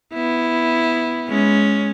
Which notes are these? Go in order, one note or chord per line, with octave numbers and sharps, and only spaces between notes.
B3 E4
G#3 C#4